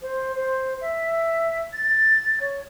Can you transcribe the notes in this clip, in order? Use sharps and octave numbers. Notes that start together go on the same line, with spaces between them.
C5
C5
E5
A6
C#5